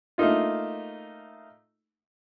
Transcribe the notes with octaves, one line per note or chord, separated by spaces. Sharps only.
A3 A#3 D#4 F4